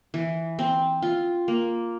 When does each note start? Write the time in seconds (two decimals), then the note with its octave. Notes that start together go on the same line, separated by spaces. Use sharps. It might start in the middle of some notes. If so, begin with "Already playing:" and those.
0.14 E3
0.59 C4
1.02 F4
1.48 A#3